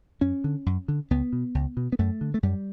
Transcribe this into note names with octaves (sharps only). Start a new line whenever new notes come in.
F#2 C#4
D3
F#2
D3
C#2 B3
B2
C#2
B2
B3
F#2 A3
D3
A3
F#2 G3